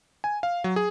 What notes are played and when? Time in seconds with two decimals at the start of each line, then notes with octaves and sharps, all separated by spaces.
0.24 G#5
0.43 F5
0.64 F#3
0.76 G#4